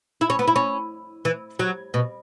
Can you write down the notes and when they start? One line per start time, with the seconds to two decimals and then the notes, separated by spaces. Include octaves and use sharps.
0.21 E4
0.30 C#4
0.39 B3
0.47 E4
0.56 C#4
1.25 E3
1.59 F#3
1.94 B2